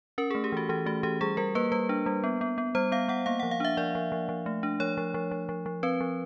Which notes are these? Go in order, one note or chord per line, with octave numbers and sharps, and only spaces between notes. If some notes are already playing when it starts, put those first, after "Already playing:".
C#4 A#4
G#4
A3
G4
E3 F#4
E3 G4
A3 F#4
E3 G4
G3 G#4
G3 A#4
A#3 B4
G3 B4
D4
G3
B3
B3
B3
G3 C5
B3 F5
B3 F#5
A#3 F5
F#5
F3
F5
D4 E5
F3 D5
F3
F3
F3
A3
D4
F3 C#5
F3
F3
F3
F3
F3
C4 B4
F3